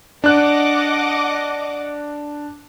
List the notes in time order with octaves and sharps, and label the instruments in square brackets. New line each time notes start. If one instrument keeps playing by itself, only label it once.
[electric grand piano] D4 F#6 [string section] D#5 F#5 D6